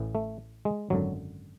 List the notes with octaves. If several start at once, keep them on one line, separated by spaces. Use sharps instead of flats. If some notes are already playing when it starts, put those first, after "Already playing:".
Already playing: A1 A2 E3
A3
G#3
G#1 F#2 D3 F#3